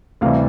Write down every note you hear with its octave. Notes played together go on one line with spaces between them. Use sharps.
D2 C3 E3 G3 F5